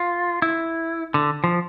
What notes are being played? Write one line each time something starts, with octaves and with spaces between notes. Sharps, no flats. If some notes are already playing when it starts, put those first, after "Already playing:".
Already playing: F4
E4
D3
F3